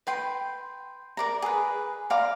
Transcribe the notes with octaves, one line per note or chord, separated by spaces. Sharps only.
B4 G5 C6
A#4 D5 A#5
G#4 B4
D5 F5 A#5 C6